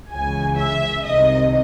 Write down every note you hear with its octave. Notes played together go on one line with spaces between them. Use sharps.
C#2 C#3 E3 G#5
E5
C2 C3 D#3 D#5